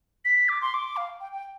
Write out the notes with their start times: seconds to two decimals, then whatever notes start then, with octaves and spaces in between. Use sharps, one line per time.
0.25 B6
0.49 D6
0.62 C6
0.74 D6
0.97 F5
1.20 G5
1.32 G5